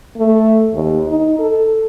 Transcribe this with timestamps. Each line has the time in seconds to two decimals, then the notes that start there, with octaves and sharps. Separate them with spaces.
0.17 A3
0.74 D#2
1.08 D#4
1.39 A4